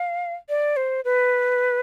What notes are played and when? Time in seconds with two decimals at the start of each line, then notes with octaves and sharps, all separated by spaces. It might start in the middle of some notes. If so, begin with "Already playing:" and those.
Already playing: F5
0.49 D5
0.77 C5
1.05 B4